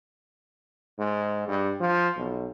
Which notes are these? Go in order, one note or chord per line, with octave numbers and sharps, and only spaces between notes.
G#2
G2
F3
B1